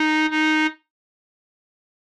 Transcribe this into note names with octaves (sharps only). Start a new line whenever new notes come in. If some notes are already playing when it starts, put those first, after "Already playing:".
Already playing: D#4
D#4